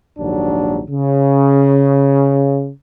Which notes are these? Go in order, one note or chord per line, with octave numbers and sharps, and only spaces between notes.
A#1 D#2 G#2 F#3 D4
C#3